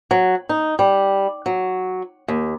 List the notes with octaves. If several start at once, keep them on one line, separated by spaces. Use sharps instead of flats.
F#3
D#4
G3
F#3
D#2